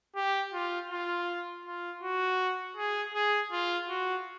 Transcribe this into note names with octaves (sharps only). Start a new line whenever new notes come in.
G4
F4
F4
F4
F#4
G#4
G#4
F4
F#4